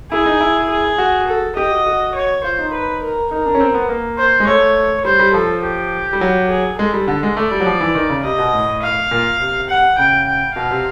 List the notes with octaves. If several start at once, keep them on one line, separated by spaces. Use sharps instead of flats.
E4 G#4
D#4
E4
G#4
F#4
A4
G4 D#5
F#4
F#4
C#5
F4 C5
D#4
B4
A#4
D#4 A#4
D4
C#4
C4
B3
A#3
C5
G#3
A3 C#5
G3 C5
G3
F3 A4
G4
G3
F#3
G#4
G#3 A4
G3
D3
G#3
A3 D5
G3
F#3
F3
E3
D#3
C#3
C3 D#5
B2
A2
F5
A#2
C3
F#5
C#3 G5
G5
B2 F5
C3